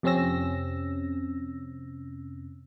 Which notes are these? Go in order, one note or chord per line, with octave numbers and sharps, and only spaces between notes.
F2 C3 C4 C#4 E6 A#6